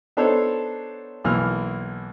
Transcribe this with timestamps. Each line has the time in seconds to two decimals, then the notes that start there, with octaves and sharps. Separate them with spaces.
0.17 B3 D4 D#4 A4 C5 C#5
1.24 B1 E3 A#3 F6